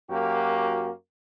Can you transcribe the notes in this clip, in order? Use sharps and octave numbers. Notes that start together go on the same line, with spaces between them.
F#2 A#3 F#4 G4